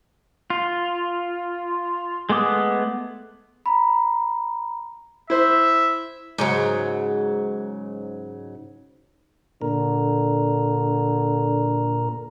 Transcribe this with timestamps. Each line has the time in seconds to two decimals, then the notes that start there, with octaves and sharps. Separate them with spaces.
0.50 F4
2.30 G#3 A3 B3 D6 D#6
3.66 A#5 B5
5.30 E4 C5 E5
6.38 G#2 C#3 F#3
9.62 A#2 D3 A#4